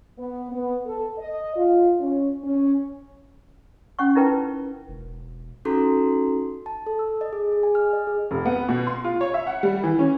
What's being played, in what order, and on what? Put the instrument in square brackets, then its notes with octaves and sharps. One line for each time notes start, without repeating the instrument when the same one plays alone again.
[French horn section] B3
B3
A4
D#5
F4
C#4
C#4
[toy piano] C#4 F#5 C#6
D#4 E4 A#4 B4 G5
[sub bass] E1
[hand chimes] C#4 D#4 F#4 A4 A#5 C6
A5
A4
E6
D#5
G#4
G#4
G#5
F6
D#5
G#4
[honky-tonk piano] F1
B3
B2
C6
F4
C#5
E5
F#5
G3
E3
C#4